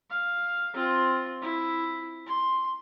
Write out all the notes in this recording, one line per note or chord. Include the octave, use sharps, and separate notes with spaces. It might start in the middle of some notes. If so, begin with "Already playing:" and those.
F5
C4 F4
E4
C6